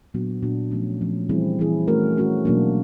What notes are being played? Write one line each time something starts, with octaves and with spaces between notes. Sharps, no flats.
A#2 F#3 B3 D4 F#4
A#2 F#3 B3 D4 F#4
F3 A3 C#4
F3 A3 C#4
E3 G3 C4 E4 G#4
E3 G3 C4 E4 G#4
A3 C#4 F#4 A#4
A3 C#4 F#4 A#4
B2 F#3 A#3 D4